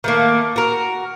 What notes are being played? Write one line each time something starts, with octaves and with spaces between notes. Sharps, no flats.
D#3 A3 A#3
F#4 A#4